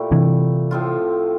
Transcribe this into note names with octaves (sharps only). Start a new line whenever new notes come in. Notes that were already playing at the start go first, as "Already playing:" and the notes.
Already playing: A#2 A3 E4 G4
C3 E3
A2 F3 C4 F4